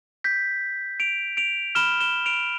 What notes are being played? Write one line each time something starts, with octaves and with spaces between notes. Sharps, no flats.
G6 B6
D7 F7
D7 F7
B5 F6 E7 G7
E7 G7
D7 F7